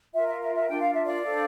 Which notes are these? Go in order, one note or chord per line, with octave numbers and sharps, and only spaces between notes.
F4 A#4 E5
E5
E5
E5
D4 F4 A#4 G5
F5
E5
D5 F5
D4 A4 C5